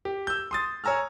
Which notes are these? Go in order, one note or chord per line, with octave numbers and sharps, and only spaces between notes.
G4
E6 G6
C6 D#6 A6
C#5 G#5 A#5 E6 F6